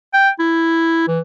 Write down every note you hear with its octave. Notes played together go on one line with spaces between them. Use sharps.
G5
E4
E3